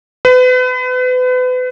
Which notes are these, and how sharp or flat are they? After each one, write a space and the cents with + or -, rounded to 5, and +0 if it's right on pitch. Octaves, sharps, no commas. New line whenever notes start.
B4 +35